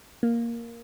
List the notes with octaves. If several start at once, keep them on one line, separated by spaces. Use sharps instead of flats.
A#3